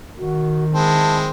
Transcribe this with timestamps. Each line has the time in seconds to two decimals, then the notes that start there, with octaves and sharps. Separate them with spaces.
0.19 D#3 F#4
0.74 G#3 C4 E4 A5